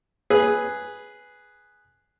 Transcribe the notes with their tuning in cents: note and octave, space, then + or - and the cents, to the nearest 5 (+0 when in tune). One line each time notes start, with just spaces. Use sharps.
G#4 +0 B4 +0